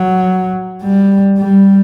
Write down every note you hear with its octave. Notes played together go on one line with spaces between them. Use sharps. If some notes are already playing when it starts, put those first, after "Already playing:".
Already playing: F#3
G3
G3